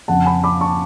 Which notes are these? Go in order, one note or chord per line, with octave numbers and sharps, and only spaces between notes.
F2 C#3 F3 F#5 A5
G#5 B5
B5 D6
A5 C#6